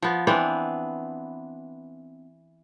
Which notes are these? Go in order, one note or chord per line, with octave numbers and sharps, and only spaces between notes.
F3 B3
E3 B3 C4 D4